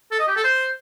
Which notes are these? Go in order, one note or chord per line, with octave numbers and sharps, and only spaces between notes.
A4
D#5
G4
A4
C5